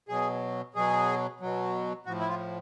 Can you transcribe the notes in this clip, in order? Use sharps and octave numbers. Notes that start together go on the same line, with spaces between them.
B2 F#3 G#4
B2 F#3 G#4
B2 F#3
A2 F3 F#4
E4
F4